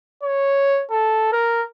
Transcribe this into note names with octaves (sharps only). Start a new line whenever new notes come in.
C#5
A4
A#4